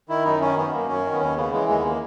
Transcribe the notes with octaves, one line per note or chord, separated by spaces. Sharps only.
D#3 E4
F#2 D#4
D#3 C#4
F#2 B3
F#2 A#3
F#2 C#4
D#3
B3
D#2 C#4
C#3 B3
E3 G#3
D#2 G#3
B3
A#3